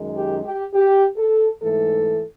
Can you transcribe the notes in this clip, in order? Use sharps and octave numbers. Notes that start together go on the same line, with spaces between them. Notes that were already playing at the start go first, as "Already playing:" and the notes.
Already playing: F#2 D#3 G#3
G4
G4
G4
A4
G#2 E3 A3 A4